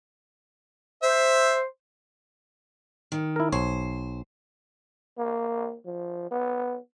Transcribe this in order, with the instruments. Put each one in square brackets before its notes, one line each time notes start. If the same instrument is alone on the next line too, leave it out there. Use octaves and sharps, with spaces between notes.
[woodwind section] C5 [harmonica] E5
[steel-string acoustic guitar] D#3
[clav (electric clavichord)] E4 A#4
[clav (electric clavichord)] B1 C#5 [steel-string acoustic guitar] C5
[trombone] A#3
F3
B3